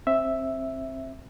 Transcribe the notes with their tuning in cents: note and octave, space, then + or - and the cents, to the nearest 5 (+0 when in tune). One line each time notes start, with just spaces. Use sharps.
C4 +20 E5 +0